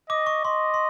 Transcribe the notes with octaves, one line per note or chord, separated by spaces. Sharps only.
D#5 D6
C#6
D#5 C6
C6